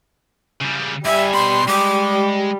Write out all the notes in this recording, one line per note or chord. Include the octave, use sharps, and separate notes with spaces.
C#3 G3
G2 G3 E5 G#5
B2 B5 C6
G3 G#3 D6